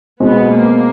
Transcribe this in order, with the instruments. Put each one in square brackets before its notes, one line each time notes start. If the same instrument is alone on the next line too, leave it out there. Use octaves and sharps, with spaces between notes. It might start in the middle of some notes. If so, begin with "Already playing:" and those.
[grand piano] B2 G#3 C4 D#4 [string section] B3
[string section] A#3